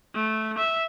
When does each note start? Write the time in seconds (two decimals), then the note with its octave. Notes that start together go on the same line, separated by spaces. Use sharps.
0.14 A3
0.58 E5